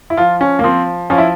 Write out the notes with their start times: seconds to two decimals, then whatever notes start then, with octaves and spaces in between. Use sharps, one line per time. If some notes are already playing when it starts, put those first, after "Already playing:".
0.10 E4
0.17 F3 F4
0.41 C#4
0.59 A#3
0.64 F3 C4
1.10 F3 C#4
1.18 E4